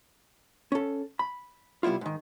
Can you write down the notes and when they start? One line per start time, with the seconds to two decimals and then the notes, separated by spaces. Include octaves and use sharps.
0.72 C#4 A4
1.19 B5
1.83 C3 G3 B3 E4 F4
2.01 G#2 D#3